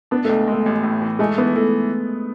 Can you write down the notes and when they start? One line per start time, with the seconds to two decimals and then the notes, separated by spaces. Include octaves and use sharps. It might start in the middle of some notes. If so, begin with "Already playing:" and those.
0.11 B3 D4
0.25 A3
0.29 C#2
0.48 G#3 A3
0.66 A1
0.83 A2
1.02 E3
1.19 G#3 A3
1.38 E3 B3
1.56 E3 A3